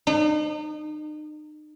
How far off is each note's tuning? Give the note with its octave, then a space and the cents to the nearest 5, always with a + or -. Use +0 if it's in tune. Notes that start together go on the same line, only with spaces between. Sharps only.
D#4 -40